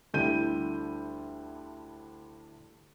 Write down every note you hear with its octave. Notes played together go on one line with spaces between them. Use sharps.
D2 D3 G3 E4 G6 D#7